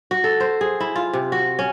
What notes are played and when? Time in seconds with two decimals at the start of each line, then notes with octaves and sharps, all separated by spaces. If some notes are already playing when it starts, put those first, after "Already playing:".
0.11 F#4
0.24 A4
0.40 C5
0.61 G#4
0.80 E4
0.96 F4
1.13 C3
1.32 F#4
1.59 C#4